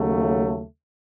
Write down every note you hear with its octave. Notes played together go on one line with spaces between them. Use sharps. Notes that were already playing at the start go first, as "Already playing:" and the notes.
Already playing: D#2 C#3 F#3 A3